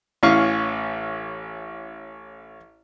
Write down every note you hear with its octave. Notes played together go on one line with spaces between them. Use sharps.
A1 E3 C#4 F5 C#6